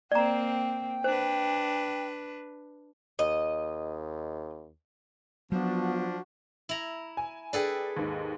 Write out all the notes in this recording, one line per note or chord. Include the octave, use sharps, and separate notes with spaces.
A#3 C4 D5 G5 A#5
D4 B4 C5
D#2 D#5
F3 F#3 B3 D4 F#4
E4 A#5
G#5
D4 G#4 A4 B4 G5
D#2 G#2